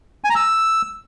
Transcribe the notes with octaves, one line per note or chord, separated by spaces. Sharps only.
G#5
A#5
E6